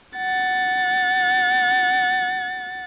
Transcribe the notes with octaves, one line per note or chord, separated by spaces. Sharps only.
F#5 A6